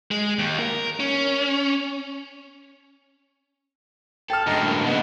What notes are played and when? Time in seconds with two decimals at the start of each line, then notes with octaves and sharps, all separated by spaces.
0.11 G#3
0.39 D#2
0.59 A#4
1.00 C#4
4.30 A4 G5 F6
4.47 F#2 A2 D3 G#3 D#5 A#5
4.64 A#3
4.86 B2 D3 G#3 B3 E4 F#5